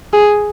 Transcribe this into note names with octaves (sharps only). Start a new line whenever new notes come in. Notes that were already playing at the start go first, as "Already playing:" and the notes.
G#4